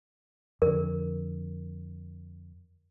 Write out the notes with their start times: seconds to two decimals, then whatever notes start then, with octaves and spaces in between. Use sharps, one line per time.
0.62 F2 D3 A#4